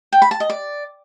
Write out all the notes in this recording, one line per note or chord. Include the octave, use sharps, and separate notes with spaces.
G5
B5
A5
D#5
D5